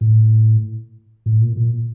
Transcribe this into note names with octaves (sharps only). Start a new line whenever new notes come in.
A2
A2
A#2
A#2